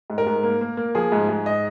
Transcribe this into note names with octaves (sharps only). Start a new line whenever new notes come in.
G#2
A#4
G#2
A#3
A#3
A#3
F3 G#4
G#2
G#2
D#5